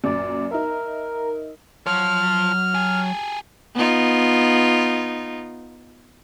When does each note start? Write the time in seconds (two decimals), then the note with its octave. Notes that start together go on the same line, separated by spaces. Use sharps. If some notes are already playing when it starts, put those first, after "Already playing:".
0.04 F#2 A#2 D5
0.51 D#4 A#4 E5
1.86 F3 F#3 C#5 F6
2.75 G4 G#4
3.74 B3 D#4 F4